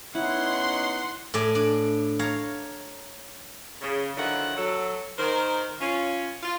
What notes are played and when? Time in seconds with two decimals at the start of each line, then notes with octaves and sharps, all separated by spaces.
0.15 B3 C#4 D#4 E4 F#5 C6
1.34 A2 D5 G#5
1.55 D4
2.19 C#5 F5 A#5
3.81 C#3
4.17 D3 D#3 F3 F#3 E4 F#5
4.57 F#3 A4
5.18 D#3 A#4 C5
5.81 C#4 F4
6.43 F4